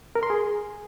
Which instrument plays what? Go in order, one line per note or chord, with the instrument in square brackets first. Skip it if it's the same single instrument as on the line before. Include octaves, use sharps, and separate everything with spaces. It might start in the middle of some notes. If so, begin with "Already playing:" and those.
[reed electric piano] A#4
C6
G#4